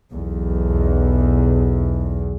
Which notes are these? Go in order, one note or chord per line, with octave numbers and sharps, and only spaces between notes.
B1 E2